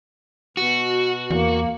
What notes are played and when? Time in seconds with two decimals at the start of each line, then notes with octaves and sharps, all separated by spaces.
0.57 B2 F#4
1.31 E2 A#3